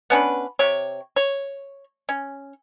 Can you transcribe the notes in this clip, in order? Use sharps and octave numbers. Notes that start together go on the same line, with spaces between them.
B3 C#4 D4 B4
C3 G4 C#5
C#5
C#4